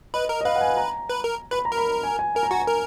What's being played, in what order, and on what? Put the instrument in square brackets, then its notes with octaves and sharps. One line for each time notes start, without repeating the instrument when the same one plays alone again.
[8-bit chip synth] B4 [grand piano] D#5
[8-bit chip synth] A#4
[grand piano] D#5
[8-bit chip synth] B4 [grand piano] F5
[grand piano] F#5
G#5
A#5
[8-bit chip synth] B4
A#4
[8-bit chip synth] B4 [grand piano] B5
[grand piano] A#5
[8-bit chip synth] A#4
[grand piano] B5
G#5
G#5
[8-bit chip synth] A#4 [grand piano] G#5
[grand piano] A#5
[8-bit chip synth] F#4 [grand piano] G#5
[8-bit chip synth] A#4